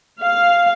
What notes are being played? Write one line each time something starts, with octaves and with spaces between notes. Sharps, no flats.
F5